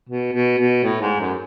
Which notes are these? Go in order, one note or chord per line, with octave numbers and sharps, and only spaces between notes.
B2
B2
B2
A2
G#2
F#2